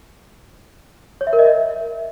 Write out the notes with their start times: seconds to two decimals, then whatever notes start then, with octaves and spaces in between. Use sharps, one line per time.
1.21 C#5
1.27 E5
1.33 A#4
1.39 D#5
1.45 E5